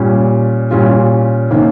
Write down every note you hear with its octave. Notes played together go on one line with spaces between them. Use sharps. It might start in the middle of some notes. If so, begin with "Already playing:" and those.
Already playing: A#2 G3 C#4
A#2 G3 C#4 F4
C3 D#3 A#3 C#4